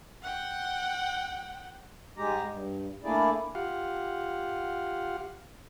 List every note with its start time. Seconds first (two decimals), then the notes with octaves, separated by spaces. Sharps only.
0.23 F#5 G5
2.17 G#2 G3 G#3 G4 A#5
2.49 G2
3.04 A3 A#3 D4 E4 G#4 D5
3.55 F4 G4 F5 F#5